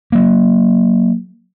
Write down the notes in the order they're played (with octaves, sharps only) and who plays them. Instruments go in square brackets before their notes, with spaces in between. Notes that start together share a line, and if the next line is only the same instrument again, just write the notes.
[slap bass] F#3 A#3